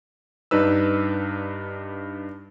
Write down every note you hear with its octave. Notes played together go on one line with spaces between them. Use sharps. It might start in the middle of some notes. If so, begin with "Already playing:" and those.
G2 D4 D#4 B4 E6